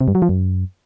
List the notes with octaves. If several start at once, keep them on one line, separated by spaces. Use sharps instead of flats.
C3
G2
F#3
F3
F#2